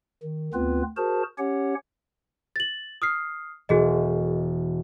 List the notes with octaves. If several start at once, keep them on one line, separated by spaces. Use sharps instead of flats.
D#3
D2 B3 C4 F4 B4
F#4 G#4 A#4 C5 A5
C#4 G4 C#5 F#5
A6 F#7
D#6 F6 C7
E1 F#4 G#4 D#5